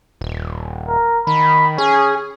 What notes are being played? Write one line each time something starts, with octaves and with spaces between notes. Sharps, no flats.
D#1
A#4
D#3 B5
C#4 G#4